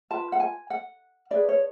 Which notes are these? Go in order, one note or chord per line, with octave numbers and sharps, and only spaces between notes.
F4 B4 A5
F#5
G#5
F#5
D4 G#4 B4 D5
C#5